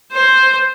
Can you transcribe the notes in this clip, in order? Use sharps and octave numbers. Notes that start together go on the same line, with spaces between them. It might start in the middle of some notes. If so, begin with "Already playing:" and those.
C5